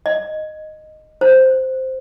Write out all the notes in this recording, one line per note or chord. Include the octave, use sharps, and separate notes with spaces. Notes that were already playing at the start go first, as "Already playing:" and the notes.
D#5
C5